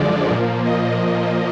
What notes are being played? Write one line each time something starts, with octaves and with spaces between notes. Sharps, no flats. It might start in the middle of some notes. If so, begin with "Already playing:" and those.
Already playing: F#2 D3 F3 G#3 D5
A#2 F3 A#3
D#5